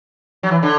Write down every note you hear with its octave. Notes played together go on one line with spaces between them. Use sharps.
F#3
E3
D3